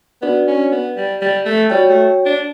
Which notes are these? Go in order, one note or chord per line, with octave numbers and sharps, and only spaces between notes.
B3 D4 F#4 B4 D5
C#4
B3
G3
G3
A3
G3 F#4 C#5 G5
A3
D4